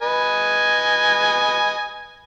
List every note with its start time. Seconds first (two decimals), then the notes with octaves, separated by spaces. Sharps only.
0.02 B4 D#5 G#5